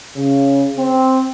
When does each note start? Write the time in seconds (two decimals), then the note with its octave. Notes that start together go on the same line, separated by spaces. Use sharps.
0.15 C#3
0.78 C4